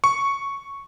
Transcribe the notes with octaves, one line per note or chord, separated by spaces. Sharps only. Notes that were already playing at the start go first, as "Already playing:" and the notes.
C#6